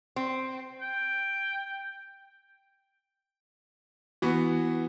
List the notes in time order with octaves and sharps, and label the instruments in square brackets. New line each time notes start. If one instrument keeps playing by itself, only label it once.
[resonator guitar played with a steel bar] C4
[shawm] G5
[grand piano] E3 B3 F#4